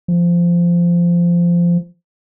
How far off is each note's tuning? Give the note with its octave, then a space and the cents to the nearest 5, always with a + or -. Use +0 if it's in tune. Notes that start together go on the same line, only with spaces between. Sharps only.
F3 -15